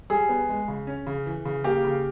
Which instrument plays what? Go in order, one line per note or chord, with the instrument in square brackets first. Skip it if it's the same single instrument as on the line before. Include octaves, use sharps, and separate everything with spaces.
[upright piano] G3 [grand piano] G#4
[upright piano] B3
G#3
C#3
C#4
C#3
E3
C#3
[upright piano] A#3 [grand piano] G4
[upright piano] C#3